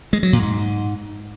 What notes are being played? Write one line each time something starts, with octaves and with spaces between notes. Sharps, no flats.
G#3
F#3
A#2
G#2